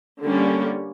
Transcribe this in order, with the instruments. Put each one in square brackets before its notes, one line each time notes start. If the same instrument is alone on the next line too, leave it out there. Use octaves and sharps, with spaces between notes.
[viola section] D3 G3 A#3 C#4